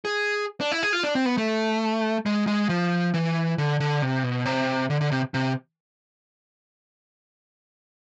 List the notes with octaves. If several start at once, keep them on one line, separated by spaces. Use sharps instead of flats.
G#4
D4
E4
G#4
F4
D4
C4
B3
A3
G#3
G#3
F3
E3
D3
D3
C3
B2
C3
D3
D3
C3
C3